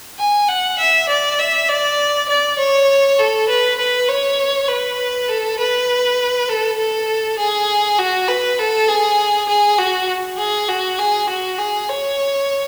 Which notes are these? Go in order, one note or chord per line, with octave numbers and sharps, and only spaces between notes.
G#5
F#5
E5
D5
E5
D5
D5
C#5
A4
B4
B4
C#5
B4
A4
B4
A4
A4
G#4
F#4
B4
A4
G#4
G#4
F#4
G#4
F#4
G#4
F#4
G#4
C#5